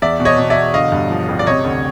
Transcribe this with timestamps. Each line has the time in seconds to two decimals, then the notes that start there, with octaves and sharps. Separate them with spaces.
0.02 E2 D5 E5
0.20 B2
0.25 C#5 D#5
0.38 B2
0.50 D5 E5
0.56 E2
0.74 D3 D#5 F5
0.92 G2
1.10 F3
1.29 A1
1.39 D5
1.46 C3 C#5 D#5
1.64 D2